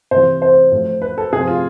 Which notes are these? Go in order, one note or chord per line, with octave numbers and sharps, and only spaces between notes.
C3 C5
E3
C5
A2 F3
B4
A4
C3 F3 G#4
F4